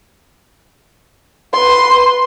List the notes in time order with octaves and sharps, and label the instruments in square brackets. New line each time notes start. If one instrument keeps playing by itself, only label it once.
[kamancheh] B4 C6